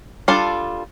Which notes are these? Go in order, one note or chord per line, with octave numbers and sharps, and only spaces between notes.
G3 D4 F4 A4